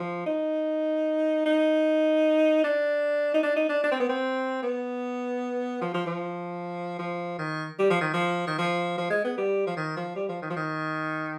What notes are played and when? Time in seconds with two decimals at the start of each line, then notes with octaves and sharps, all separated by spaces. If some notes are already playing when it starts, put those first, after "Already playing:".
Already playing: F3
0.26 D#4
1.46 D#4
2.64 D4
3.34 D#4
3.43 D4
3.56 D#4
3.69 D4
3.83 D4
3.91 C4
4.00 B3
4.09 C4
4.62 B3
5.81 F3
5.94 F3
6.06 F3
6.99 F3
7.38 D#3
7.79 G3
7.90 F3
8.01 D#3
8.13 F3
8.47 D#3
8.58 F3
8.97 F3
9.10 G#3
9.24 B3
9.37 G3
9.67 F3
9.76 D#3
9.96 F3
10.16 G3
10.29 F3
10.42 D#3
10.50 F3
10.56 D#3